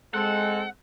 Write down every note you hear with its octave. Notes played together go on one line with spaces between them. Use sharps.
G#3 C4 A4 F#5